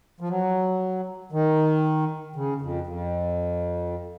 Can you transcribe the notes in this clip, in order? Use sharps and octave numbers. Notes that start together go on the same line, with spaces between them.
F3
F#3
D#3
C#3
F2
F2